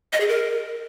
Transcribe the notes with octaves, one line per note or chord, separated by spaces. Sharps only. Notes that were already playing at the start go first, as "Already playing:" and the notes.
D#5
G#4
A#4